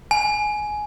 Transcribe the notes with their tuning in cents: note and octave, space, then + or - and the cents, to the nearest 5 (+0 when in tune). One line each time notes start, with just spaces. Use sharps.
G#5 +15